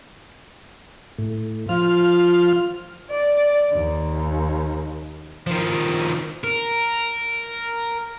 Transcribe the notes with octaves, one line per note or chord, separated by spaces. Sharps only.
A2
F3 F4 F6
D5
D#2
D#3 F3
A#4